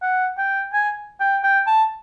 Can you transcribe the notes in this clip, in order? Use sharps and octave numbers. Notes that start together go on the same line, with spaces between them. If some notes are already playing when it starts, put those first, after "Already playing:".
F#5
G5
G#5
G5
G5
A5